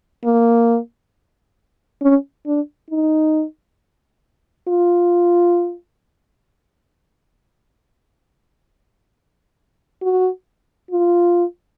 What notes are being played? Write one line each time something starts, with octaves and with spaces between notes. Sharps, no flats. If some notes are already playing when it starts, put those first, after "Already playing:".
A#3
C#4
D4
D#4
F4
F#4
F4